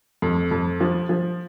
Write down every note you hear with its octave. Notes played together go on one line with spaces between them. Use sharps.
F2
F2
F3
F3